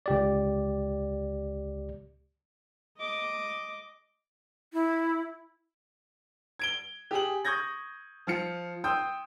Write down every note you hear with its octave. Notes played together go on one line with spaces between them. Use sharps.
C#2 G4 D5
D#5 D6
E4
G#6 D7 G7
G4 G#4 F#7
C#6 D#6 G6 G#6 A#6
F3 F4 C#7
G5 C6 D#6 E6 G6